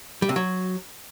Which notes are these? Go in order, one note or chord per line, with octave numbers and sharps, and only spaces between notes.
G3
C3
F#3